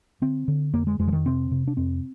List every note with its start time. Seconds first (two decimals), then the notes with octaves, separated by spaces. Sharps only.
0.22 D3 C4
0.48 D3
0.73 F2 A#3
0.87 G#3
0.99 F2 G#3
1.08 F3
1.13 D#3
1.25 C3 C4
1.51 C3
1.68 D4
1.77 F2 C4